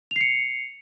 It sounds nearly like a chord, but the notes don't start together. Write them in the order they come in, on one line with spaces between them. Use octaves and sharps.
F7 C7 C#7